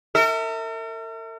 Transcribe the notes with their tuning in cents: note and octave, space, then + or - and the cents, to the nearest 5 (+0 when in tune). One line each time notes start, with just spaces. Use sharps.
A#4 -45 E5 -25